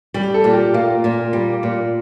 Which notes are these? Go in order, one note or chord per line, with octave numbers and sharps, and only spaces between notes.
G3 G4
A4
A#2
G4
A#3 F4
A#2
G3
A#2